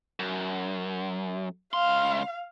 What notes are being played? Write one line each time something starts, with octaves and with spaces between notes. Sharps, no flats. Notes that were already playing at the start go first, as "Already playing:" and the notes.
F#2
C#2 F5 C6